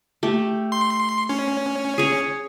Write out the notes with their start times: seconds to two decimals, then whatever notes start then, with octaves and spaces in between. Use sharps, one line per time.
0.23 A3 G4
0.72 C6
1.29 C#4
1.98 G#4 C#5